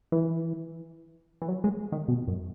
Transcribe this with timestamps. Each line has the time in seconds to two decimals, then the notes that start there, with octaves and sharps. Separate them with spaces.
0.12 E3
1.42 E3
1.48 F#3
1.64 G#3
1.92 D#3
2.08 B2
2.28 F#2